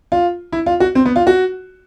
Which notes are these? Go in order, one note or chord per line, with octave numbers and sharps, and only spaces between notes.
F4
E4
F4
F#4
C4
B3
F4
F#4